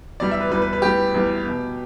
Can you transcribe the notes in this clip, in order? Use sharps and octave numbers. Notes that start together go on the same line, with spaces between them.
E2 E3 G3 D5
E5
B4
E2 E3 G3 B4
B4
B4
E2 E3 G3 G4
E2 E3 G3
B2 B3